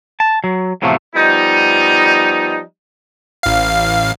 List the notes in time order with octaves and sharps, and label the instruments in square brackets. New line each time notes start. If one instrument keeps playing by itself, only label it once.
[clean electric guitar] A5
F#3
E2 A2 C3 F3 F#3 A3
[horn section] F3 G3 B3 D#4
[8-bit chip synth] A1 F5